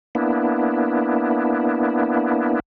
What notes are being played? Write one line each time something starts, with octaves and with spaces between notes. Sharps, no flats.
A#3 B3 D4 E4